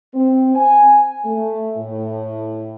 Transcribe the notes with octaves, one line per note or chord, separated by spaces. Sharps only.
C4
G#5
A3
A2